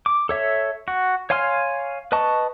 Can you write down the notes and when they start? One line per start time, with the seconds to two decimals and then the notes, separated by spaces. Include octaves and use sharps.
0.06 D6
0.29 A4 C#5 E5
0.88 F#4
1.30 C#5 F5 G#5 C6 F6
2.12 B4 D#5 A5 C#6